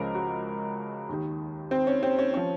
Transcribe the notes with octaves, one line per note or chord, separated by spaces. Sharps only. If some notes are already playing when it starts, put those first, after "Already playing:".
Already playing: C#2 C#3 F3 A#4
F#4
D#2 D#3
C4
C#4
C4
C#4
F3 C#4